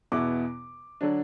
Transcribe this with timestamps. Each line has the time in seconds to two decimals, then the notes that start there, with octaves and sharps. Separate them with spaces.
0.12 E2 B2 B3 E4 D6
1.01 D3 F#3 D4